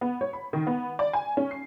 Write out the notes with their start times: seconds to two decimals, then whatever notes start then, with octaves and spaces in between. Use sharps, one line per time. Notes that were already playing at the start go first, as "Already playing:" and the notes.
0.01 B3
0.21 C#5
0.33 B5
0.53 D#3
0.67 B3
0.99 D5
1.13 G#5
1.37 C#4
1.51 C7